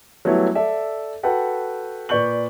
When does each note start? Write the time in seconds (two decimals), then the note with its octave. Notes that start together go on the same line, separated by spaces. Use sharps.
0.25 F#3 G3 A3 B3 E4 C#5
0.55 A4 D5 E5
1.23 F#4 A4 B4 F#5 G5
2.09 A#2 B4 D5 C#6 G6 F#7